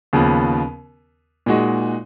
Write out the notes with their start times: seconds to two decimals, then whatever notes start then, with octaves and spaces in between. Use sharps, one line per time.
0.13 D#2 C#3 F3 B3
1.46 A#2 G#3 D#4 F#4